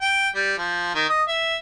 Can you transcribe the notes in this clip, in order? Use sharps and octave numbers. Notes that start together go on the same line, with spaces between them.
G5
G3
F3
D#3
D#5
E5